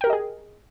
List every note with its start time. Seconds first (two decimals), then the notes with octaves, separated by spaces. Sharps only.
0.01 G5
0.04 A#4
0.07 G4
0.10 D#5
0.13 G#4